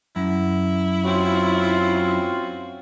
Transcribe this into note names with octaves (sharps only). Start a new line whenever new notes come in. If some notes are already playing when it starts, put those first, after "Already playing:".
F#2 E4
C4 C#4 F4 F#4